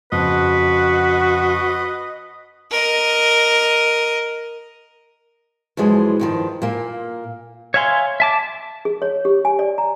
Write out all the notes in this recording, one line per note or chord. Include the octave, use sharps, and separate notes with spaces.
F2 C#3 F#4 B4 D#5
A#4 D#5
F#2 E3 F3 G#3
G2 D#3 F3
A#2 A#3
C#5 E5 F5 G#5 C6
E5 A5 D6
G#4
C#5
G4
G#5
D5
A#5